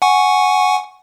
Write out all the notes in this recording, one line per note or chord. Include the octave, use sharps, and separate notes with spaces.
F#5 G#5 C#6